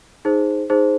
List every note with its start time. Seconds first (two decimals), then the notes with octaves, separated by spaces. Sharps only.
0.25 D#4 G#4 C5
0.70 D#4 G#4 C5